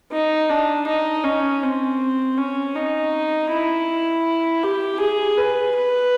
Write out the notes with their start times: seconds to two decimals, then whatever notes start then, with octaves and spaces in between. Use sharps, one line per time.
0.12 D#4
0.50 D4
0.87 D#4
1.24 C#4
1.63 C4
2.38 C#4
2.75 D#4
3.50 E4
4.63 G4
5.00 G#4
5.38 B4
5.75 B4